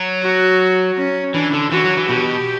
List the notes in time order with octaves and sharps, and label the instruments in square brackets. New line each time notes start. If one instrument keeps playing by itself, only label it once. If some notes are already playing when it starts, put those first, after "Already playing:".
Already playing: [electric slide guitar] F#3
[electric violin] F#4
C#4
[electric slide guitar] E3 [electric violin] D4
[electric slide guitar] D3
[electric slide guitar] E3 [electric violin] F#4
[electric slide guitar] F#3
E3
[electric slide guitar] B2 [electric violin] G4